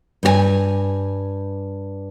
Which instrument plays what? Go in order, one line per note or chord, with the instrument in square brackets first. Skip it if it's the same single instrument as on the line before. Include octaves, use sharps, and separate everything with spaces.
[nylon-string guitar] G2 G4 G#5